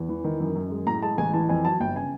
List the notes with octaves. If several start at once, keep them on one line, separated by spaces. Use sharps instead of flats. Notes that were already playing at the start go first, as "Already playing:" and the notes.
Already playing: E2
E3
D#3
F#2
F#2
G#3
A2 A#5
G#3 A5
A1 G#5
E3 A5
F2 G#5
F#3 A5
G1 G5
C#3 G#5